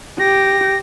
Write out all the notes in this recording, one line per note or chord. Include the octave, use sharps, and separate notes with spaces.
G4 A#6